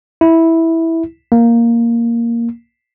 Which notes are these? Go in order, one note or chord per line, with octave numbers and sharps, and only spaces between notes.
E4
A#3